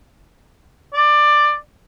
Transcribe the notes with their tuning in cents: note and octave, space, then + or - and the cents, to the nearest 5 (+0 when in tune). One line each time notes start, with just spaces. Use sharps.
D5 +15